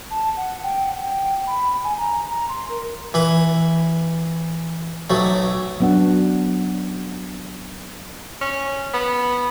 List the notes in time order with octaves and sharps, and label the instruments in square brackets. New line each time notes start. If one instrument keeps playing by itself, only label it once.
[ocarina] A5
F#5
G5
F#5
G5
B5
G#5
A#5
A#5
C6
A#4
[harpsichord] E3 B4
B1 F#3 A3
[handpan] F#3 B3 D4 F#5
[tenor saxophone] C#4
B3